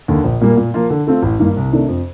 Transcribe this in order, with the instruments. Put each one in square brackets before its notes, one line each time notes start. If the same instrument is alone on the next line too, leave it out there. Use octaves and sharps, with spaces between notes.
[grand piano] D#2 D3
A#1
A#2 G3 A#3
A#2
F3 A#3 F4
D3
A3 C4 F4
A1
G2 D#3 A#3
C2
C3 D#3 A3 D4
F2